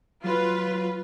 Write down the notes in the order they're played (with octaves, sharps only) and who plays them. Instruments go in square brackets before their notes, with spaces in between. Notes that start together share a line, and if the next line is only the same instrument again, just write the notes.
[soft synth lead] F#3 [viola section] F4 B4